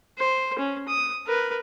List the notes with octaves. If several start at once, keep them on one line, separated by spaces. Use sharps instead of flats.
C5
C#4
D#6
A#4 B4